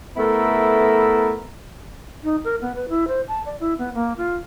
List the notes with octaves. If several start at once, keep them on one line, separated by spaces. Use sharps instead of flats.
A3 B3 E4 A4 A#4
D#4
A#4
B3
B4
E4
C5
A5
D5
E4
B3
A#3
F4